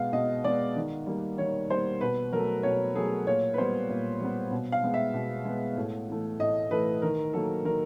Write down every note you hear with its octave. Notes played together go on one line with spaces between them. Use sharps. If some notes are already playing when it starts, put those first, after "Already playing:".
Already playing: B2 G#3 B3 F5
B2 D#5
G#3 B3 D5
D#3
G3 A#3
D#3 C#5
G3 A#3 C5
B2 B4
F#3 A3 A#4
B2 C#5
F#3 A3 G#4
A#2 C#5
B4
G3 B3 C5
A#2
G3 B3
B2
F5
G#3 B3
E5
B2
G#3 B3
A2
E3 A3
A2 D#5
E3 A3 B4
D#3 A#4
F#3 A#3 A4
D#3 A#4